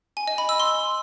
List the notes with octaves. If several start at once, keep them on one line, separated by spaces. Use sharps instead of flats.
G#5
D#5
B5
E6
C6